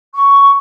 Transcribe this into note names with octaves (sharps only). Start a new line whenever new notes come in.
C#6